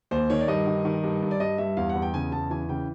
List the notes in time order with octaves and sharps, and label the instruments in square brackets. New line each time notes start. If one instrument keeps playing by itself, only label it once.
[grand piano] D#2 C5
D#3 C#5
D5
G2 D#5
D#3
D#3
G2
G2
D5
G2 D#5
G2 E5
E2 F5
F#5
E2
G5
C#3 G#5
E2 A5
E3 G#5
C#3 G5